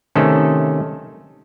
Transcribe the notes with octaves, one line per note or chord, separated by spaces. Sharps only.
C3 D#3 A3 C#4 A4